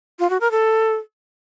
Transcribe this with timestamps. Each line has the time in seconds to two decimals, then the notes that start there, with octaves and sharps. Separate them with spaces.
0.19 F4
0.30 F#4
0.41 A#4
0.51 A4